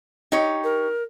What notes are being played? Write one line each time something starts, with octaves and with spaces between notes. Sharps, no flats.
D#4 G4 C#5
A#4